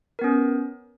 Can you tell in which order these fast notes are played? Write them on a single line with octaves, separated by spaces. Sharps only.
A#4 B3 C#4